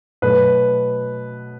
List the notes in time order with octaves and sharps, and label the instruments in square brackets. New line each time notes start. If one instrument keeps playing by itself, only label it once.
[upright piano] B2 F#3 A3 B4